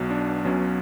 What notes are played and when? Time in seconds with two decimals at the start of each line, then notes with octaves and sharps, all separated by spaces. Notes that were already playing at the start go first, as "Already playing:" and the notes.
Already playing: B1 B2 F#3
0.10 D4
0.44 B1 B2 F#3 C#4